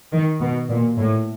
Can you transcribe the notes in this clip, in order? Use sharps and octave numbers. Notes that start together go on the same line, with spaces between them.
D#3
B2
A#2
A2